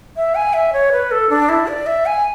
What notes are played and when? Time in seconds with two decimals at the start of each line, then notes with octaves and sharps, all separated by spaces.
0.16 E5
0.35 G#5
0.54 E5
0.73 C#5
0.92 B4
1.11 A4
1.30 D4
1.49 E4
1.67 D5
1.86 E5
2.06 G#5